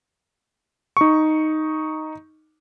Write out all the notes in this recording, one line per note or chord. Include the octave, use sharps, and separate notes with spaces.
D#4 C#6